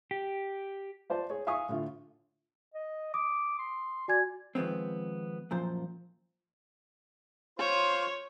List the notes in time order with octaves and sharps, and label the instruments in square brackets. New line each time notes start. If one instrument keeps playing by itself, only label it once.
[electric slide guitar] G4
[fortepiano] F4 C5 D5 A5
G#4 C#5
E5 F5 G#5 C#6 D#6
A2 D3 F4
[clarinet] D#5
[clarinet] D6 [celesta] D#6
[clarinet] C6
[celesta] F#4 G#5 G#6 [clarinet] D5
[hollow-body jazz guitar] D#3 F3 G#3 B3 C4
F#2 A#2 F3 C5
[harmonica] F4 C5 C6 [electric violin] C#5